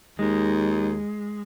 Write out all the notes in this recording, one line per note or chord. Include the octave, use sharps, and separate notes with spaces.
D#2 G#3